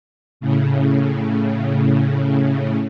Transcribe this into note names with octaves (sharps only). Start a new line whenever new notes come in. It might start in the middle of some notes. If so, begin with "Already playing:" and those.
A2 C#3